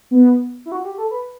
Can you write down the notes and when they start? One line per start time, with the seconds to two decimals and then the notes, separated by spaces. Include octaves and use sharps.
0.11 B3
0.66 E4
0.72 F#4
0.85 G4
0.98 A4
1.11 B4